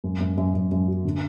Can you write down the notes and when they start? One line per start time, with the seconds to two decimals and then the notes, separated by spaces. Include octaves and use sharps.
0.04 F#2
0.20 F#2
0.37 F#2
0.54 F#2
0.71 F#2
0.88 F#3
1.05 D3